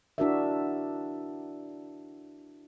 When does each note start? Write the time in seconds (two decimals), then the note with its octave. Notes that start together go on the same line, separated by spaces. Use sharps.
0.18 D4 E4 F#4 A#4 D5 E5